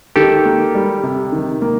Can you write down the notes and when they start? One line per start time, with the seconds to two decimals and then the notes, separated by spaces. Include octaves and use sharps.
0.16 D#3 G4 A4
0.45 A#3
0.75 G3
1.03 C3
1.32 D#3
1.62 A#3